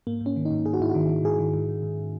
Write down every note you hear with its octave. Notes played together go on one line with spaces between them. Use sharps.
G#2 A#3
G#2
C#4
D#3
D#4
G#2
G#2 G#4
F#4
G#2 E4
F#4
D#3
D#3
G#2 G#4
D#3
G#2
G#2
G#2